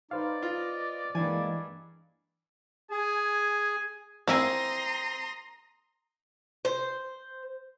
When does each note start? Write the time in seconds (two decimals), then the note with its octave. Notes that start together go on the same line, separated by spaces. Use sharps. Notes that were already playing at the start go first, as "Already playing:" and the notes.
0.11 D#4 B4 C5 D5 F5
0.42 F4 D#5
1.15 G2 E3 G#3 A#3 D4 G#5
2.91 G#4 G#5
4.27 A#3 C4 E4 G#5 A#5 C6 D#6
6.65 C5